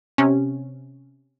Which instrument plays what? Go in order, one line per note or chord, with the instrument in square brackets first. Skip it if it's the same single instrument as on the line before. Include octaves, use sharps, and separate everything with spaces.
[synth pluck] C3 C#4